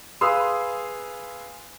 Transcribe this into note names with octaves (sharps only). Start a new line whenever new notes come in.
G#4 B4 F5 C6 D#6 E6